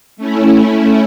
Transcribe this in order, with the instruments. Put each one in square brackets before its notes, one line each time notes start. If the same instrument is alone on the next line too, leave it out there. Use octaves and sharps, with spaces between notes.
[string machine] A3 C#4 E4